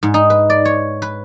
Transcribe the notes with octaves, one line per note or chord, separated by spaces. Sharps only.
G#2
D#4
B4
D5
C#5
B4